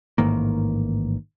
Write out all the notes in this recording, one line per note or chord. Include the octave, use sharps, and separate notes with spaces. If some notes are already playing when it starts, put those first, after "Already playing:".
A1 G#2 D#3 A#3